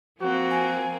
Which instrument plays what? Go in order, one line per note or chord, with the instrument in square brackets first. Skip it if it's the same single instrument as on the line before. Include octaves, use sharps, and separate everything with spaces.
[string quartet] F3 A#3 C4 [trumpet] F#4
[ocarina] G#5